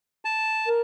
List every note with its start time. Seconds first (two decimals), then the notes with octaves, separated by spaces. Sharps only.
0.25 A5
0.66 A#4